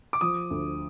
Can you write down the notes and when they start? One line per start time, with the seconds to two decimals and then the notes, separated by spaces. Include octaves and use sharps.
0.13 D6
0.21 F3 D#6
0.50 D2